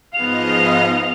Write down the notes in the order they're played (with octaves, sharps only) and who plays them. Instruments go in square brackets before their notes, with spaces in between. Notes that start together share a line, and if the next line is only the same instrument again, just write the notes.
[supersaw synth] G#2 F3 D#5 [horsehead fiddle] B3 F5 [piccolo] F7